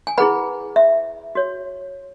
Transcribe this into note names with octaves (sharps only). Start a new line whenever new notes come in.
G#5
E4 G#4 B4 F#5 B5
E5
F#4 C#5